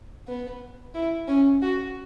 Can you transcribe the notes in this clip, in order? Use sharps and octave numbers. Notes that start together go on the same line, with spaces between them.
B3
E4
C#4
F#4